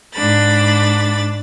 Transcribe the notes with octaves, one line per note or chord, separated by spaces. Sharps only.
G#2 D4 B5 A6